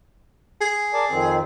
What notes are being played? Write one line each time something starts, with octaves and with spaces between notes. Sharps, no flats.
G#4
A#4 D5 A5
F2 D#3 C4